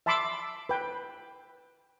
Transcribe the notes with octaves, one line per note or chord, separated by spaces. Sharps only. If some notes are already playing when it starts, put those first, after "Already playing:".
E5 A5 B5 C6 D6 E6
B4 G5